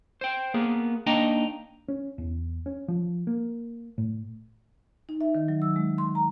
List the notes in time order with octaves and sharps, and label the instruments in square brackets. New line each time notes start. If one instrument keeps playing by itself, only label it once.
[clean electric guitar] C5 G5
A#3 B3 G#4 A#4
A#3 D4 D#4 D#5 G5 A#5
[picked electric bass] C#4
E2
C#4
F3
A#3
A2
[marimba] D#4
E5
D#3
F#3
E6
G#3
C6
A#5